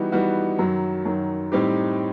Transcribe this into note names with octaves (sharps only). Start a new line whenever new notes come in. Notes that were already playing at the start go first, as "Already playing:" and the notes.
Already playing: E3 G3 B3 D#4 F#4
E3 G3 B3 D#4 F#4
F#2 D#3 F#3
F#2 D#3 F#3
A2 G3 C4 D#4 G4